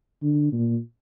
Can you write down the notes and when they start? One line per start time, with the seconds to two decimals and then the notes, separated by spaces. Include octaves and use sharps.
0.23 D3
0.53 A#2